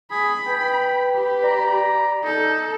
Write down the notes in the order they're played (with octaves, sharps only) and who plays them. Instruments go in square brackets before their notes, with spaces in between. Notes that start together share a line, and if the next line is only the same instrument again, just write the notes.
[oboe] G#4 [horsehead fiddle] B5
[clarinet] B4 [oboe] G5
[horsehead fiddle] G4 B5
[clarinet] D5 [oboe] A#5
[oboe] D#4 [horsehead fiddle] A4